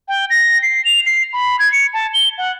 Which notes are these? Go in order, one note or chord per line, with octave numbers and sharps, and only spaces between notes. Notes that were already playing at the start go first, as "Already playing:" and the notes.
G5
A#6
C7
F7
C7
B5
G#6
C#7
A5
G7
F#5